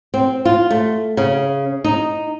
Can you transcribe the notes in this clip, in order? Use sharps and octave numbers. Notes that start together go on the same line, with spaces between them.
C4
F4
A3
C#3
D#4